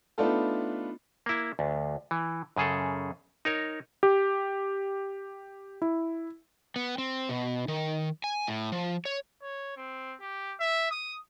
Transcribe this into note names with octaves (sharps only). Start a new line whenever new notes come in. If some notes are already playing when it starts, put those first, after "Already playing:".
A3 B3 D4 D#4 F4 A4
A#3 E4
D2
E3
F#2 C#3 G#4 A4
D#4 A#4 C#5
G4
E4
B3
C4
B2
D#3
G#5
A2
F3
C#5
C#5
C4
G4
E5
D#6